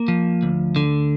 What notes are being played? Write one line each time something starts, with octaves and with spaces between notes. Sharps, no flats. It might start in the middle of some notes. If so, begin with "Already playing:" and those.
Already playing: A#3
F3
D2
D3